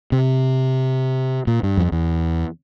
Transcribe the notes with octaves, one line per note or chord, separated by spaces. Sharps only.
C3
A#2
G2
F2
E2